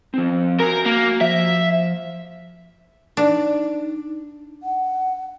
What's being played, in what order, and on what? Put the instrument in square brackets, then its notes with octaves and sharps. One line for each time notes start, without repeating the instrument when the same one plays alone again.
[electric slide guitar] F3 C4
[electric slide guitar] F#4 G#5 [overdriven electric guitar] A#4
[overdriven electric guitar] A#3
[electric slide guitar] F3 [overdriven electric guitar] E5
[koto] D4 [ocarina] D#4
[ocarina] F#5